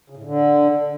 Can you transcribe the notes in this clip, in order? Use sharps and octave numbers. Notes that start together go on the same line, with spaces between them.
C#3
A2
D3